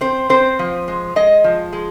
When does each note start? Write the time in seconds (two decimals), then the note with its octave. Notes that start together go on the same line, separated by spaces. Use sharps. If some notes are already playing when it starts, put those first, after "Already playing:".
0.01 C4 C5
0.29 C4 C5
0.59 F3
0.88 G#3
1.16 G#3 D#5
1.44 F3
1.73 G#3